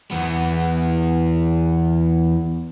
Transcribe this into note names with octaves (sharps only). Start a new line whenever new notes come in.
E2 B3